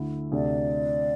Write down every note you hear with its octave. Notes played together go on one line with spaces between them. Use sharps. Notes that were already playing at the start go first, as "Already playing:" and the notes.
Already playing: D2 D3 A3 E4
D2 C3 A3 D4 D5